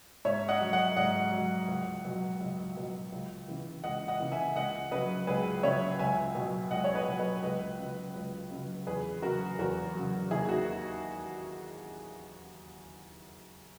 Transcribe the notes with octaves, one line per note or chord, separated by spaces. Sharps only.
G#2 C#5 E5
D#5 F#5
F#3
D#5 F#5
G#2 D#5 F#5
F#3
C#2
B2 F#3
C#2
B2 F#3
C#2
C#3 E3
C#2 D#5 F#5
D#5 F#5
C#3 E3
E5 G#5
C#2 D#5 F#5
C#3 F#3 B4 D#5
C#2 G#4 B4
C#3 F#3 C#5 E5
C#2 E5 G#5
B2 F#3
C#2 D#5 F#5
C#5
B4 D#5
B2 F#3
B4 D#5
C#2 B4 D#5
C#3 F#3
C#2
C#3 F#3
E2 G#4 B4
C#3 F#3 F#4 A#4
E2 F#4 A#4
C#3 F#3
D#2 E4 G#4
D#4 F#4